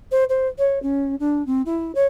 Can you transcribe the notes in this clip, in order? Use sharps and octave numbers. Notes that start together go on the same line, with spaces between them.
C5
C5
C#5
C#4
D4
C4
E4
C#5